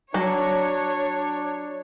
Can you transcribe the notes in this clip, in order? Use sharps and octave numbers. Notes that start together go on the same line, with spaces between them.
F#3 D4 C#5